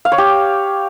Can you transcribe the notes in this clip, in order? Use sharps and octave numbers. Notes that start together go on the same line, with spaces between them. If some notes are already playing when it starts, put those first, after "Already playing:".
F5
C#5
G4